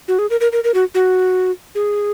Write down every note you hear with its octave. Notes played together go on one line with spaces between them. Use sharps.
F#4
G#4
A#4
A#4
A#4
A#4
F#4
F#4
G#4